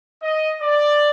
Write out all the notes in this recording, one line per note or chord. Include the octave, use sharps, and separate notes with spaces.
D#5
D5